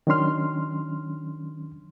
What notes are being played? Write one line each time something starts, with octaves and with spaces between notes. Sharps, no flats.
D#3 F#3 C#4 D4 C6 F6